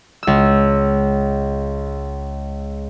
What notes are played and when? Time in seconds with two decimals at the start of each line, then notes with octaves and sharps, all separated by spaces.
0.23 C#2 E6